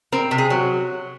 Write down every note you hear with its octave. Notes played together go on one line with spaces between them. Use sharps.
C4 A#4
C3
G#4
F#3